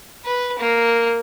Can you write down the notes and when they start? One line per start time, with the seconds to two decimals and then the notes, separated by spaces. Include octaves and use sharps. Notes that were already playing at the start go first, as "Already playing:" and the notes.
0.25 B4
0.58 A#3